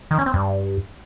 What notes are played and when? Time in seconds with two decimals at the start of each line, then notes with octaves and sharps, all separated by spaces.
0.11 D#3
0.18 C#4
0.26 C4
0.34 G2